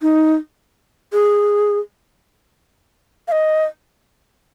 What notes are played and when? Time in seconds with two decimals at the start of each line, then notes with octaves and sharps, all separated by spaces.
0.02 D#4
1.13 G#4
3.28 F5
3.32 D#5